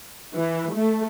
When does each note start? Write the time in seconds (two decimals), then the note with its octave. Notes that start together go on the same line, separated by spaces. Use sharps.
0.35 E3
0.73 A3